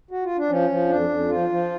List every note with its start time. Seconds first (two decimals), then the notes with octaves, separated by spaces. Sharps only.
0.11 F#4
0.24 F4
0.37 D4
0.49 F3 C#4
0.70 F3
0.89 F2 D4
1.09 F2
1.29 F3 F4
1.49 F3